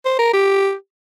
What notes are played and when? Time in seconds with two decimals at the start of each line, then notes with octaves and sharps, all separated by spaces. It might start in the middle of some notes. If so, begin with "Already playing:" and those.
0.05 C5
0.19 A#4
0.33 G4